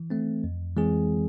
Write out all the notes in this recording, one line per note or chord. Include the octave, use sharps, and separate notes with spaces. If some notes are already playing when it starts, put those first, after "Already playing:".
Already playing: E3
A3 C4
F2
E3 G#3 C4 G#4